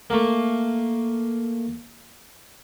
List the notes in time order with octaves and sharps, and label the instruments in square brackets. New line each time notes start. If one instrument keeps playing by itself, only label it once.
[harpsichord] A3 A#3